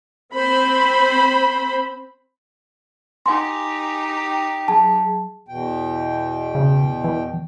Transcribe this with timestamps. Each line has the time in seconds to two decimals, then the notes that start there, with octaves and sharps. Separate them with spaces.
0.34 C4 C5 B5
3.26 D#4 G4 G#5 C6
4.26 G5
4.68 F#3 G#4 A5
5.49 E2 B2 G5
6.55 C#3
7.04 E3